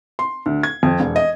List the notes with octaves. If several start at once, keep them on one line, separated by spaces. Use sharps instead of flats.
C6
D2
G#6
F2
E1
D#5